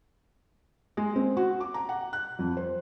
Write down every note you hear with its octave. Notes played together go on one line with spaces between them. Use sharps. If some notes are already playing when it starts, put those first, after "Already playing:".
G#3
C4
F#4
D6
A#5
F#5
F#6
F2
C5